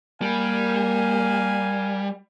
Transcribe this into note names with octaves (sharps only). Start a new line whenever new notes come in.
G3 A#3 A#4 F5 G#5